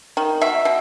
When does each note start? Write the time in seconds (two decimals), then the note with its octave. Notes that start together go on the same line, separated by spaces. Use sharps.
0.17 D#3
0.41 B2 E5
0.65 B2